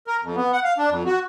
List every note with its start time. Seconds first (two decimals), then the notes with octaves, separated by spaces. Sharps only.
0.07 A#4
0.23 F2
0.36 B3
0.53 F#5
0.64 F5
0.78 D4
0.90 F2
1.06 F#4